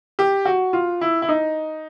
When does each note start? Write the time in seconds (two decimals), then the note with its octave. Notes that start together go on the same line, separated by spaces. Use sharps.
0.19 G4
0.45 F#4
0.73 F4
1.01 E4
1.22 E4
1.29 D#4